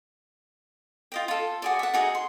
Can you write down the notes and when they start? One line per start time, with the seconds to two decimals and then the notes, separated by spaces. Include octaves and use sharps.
1.12 F4 D#5 G5
1.28 F4 A4
1.62 F#4 G#4 D5
1.79 E5 F#5
1.94 D#4 F#4 G#4
2.15 C6